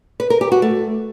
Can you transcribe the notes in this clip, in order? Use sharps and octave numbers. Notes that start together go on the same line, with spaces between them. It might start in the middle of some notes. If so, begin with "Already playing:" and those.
B4
A#4
G4
F#4
A3